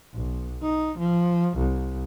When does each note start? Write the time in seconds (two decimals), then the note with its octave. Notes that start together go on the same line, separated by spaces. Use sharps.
0.14 B1
0.62 D#4
0.99 F3
1.57 C2